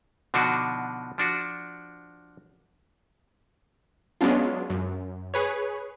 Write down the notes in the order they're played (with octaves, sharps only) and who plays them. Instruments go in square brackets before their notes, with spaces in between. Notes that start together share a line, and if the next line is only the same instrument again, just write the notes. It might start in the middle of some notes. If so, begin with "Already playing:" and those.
[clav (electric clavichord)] B2 D3 F3 D4 D#4 F#4
F3 D4 F#4
[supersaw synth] F#3 G#3 B3 C#4 D4 F4
F#2
G#4 B4 C#5